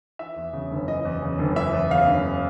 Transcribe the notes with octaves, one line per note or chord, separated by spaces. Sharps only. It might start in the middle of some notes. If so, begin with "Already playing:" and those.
E3 E5
E2
C#3
F#1
E3 D#5
E2
C#3
F#1
E3 E5
E2
C#3 F5
F#1
E3